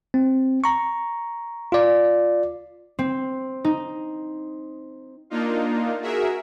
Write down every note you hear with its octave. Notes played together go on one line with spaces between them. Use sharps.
C4
A#5 C#6
F4 D5
C4
D#4
A#3 D4 D#4 F4
F#4 G#4 A#4 E5